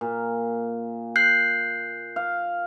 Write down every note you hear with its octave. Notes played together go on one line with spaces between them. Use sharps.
A#2
F#6 G6 C7
F5